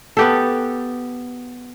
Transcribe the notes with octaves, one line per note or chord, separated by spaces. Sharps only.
B3 G4 A4